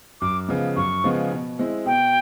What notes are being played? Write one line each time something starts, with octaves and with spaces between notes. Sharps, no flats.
F#2 D6
C#3 F3 G#3 B3
F#2 C#6
C#3 F3 G#3 B3
B2
G#3 C4 E4
B2 G5